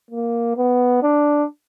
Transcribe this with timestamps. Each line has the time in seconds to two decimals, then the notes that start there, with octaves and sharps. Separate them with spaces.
0.11 A#3
0.57 B3
1.03 D4